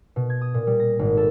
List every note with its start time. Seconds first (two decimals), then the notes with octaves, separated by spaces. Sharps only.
0.16 B2
0.30 G#6
0.41 D#6
0.54 A#2
0.67 G3
0.80 A#6
0.99 G#1
1.17 A4